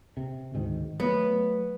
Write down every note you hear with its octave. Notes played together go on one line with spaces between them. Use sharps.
C3
D2 G#2 D#3
F#3 A3 B3